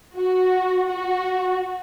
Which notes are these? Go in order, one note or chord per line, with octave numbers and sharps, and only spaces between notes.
F#4
F#4